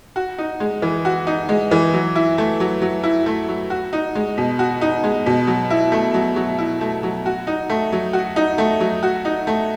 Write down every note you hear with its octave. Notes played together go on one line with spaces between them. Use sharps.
F#4
D#4
G#3
E3
F#4
D#4
G#3
E3
F#3
E4
A3
F#3
F#3
E4
A3
F#3
F#4
D#4
G#3
B2
F#4
D#4
G#3
B2
F#3
E4
A3
F#3
F#3
E4
A3
F#3
F#4
D#4
A3
F#3
F#4
D#4
A3
F#3
F#4
D#4
A3